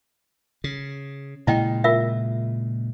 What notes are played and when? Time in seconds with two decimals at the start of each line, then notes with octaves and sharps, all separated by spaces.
0.64 C#3
1.47 A#2 C#3 G#3 E4 D#5 G5
1.84 F4 A#4 E5